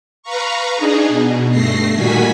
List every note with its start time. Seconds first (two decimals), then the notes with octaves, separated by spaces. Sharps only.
0.23 B4 F5 A#5 C#6
0.76 D4 D#4 G#4
1.08 B2
1.50 G2 A3 A#6 C7
1.95 A#2 D#3 G3 F#4 G#5 B6